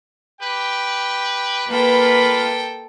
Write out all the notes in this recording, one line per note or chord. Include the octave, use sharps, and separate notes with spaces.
G4 B4 G5
A#3 F4 A4 B4 G5 B5